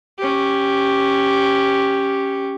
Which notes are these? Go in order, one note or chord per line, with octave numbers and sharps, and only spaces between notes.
C#4 G4